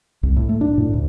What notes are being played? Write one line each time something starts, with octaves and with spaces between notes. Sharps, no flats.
C2
A2
A3
D4
A2
D2